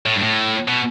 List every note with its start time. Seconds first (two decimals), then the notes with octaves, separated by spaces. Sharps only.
0.06 A2
0.16 G2
0.21 A2
0.68 B2